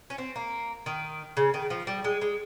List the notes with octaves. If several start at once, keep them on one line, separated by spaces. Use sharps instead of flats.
C#4
C4
A#3
D#3
C#3
D#3
F3
G3
G#3
G#3